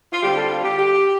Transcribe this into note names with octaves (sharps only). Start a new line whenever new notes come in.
F4
D3 G3 C4 F4 G4
A4
F4
G4
G4